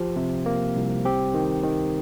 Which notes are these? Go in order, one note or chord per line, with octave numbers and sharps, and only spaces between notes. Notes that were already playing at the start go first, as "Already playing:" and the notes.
Already playing: F3 G4
C3
A#3
C2
C4 G4
D#3
D#3